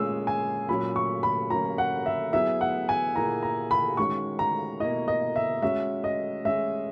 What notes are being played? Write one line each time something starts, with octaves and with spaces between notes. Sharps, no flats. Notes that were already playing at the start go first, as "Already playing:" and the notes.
Already playing: A#2 G#3 C#4 G#4 E6
G#5
A#2 F#3 C#4 B5
C#6
B5
F#3 A#3 C#4 A#5
F#5
E5
F#3 B3 E4 G#4 E5
F#5
G#5
A#2 A#3 E4 G#4 A#5
A#5
B5
D#3 G#3 C#4 F#4 C#6
A#5
B2 A#3 E4 D#5
D#5
E5
G#3 C#4 F#4 E5
D#5
G#3 C#4 G#4 E5